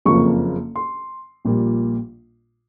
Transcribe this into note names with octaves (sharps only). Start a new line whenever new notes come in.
F#1 F2 C#3 F3 A#3 C#6
C6
A#1 A#2 G3 A#3